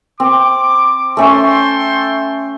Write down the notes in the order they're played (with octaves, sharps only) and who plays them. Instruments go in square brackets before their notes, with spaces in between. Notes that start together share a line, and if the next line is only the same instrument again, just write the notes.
[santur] C4 [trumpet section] D6
[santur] A3 C#4 E5 [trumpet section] A4 G5 C6